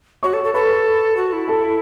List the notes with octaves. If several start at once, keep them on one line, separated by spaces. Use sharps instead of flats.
F#4 C#5 C#6
A4
A4
A4 B4 B5
F#4
E4
A4 A5